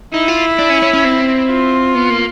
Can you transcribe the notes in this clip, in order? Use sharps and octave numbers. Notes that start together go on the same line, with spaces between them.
D#4 E4
F4
D4
C#4
C#4
C#4
C4
F4
B3
A#3